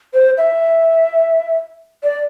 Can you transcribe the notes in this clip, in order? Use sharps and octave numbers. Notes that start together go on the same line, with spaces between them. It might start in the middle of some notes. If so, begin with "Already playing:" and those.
C5
E5
D5